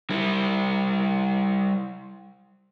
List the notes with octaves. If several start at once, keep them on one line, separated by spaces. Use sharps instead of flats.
G3 E4